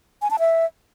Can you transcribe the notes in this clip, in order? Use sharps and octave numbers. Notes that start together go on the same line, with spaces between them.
G#5
A5
E5